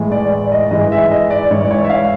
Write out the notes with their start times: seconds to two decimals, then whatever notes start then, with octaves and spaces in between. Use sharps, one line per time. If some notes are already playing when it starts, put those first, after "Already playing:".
Already playing: A2 E3 G#3
0.12 D5
0.32 D5
0.52 D#5
0.71 G#2 E3 G#3 D#5
0.92 E5
1.11 D#5
1.30 D5
1.50 G#2 E3 G#3 C#5
1.65 D5
1.71 C#5
1.84 E5
1.90 F5